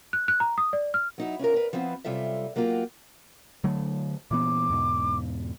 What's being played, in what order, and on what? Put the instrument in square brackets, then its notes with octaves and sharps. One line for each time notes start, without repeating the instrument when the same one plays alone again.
[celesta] F#6
F#6
A#5
D#6
D5
F6
[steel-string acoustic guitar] F#3 D#4 E4
C#4 D4 F4 A#4
A#4 B4
F3 B3 C4 E4
F#2 C3 G3 F4 A4 E5
F#3 A#3 E4 F4 G4
[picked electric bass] D3 F#3 A3
[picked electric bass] A#2 E3 B3 [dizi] D6
[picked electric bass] E2 G#2 B2